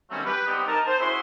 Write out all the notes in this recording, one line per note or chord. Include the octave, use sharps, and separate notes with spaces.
D#3 F#3 G3 A3 C4 C#4
G4 B4
G3 B3 C4 D#4 G4
D#4 A#4 A5
C5
C#4 E4 F#4 G#4 C6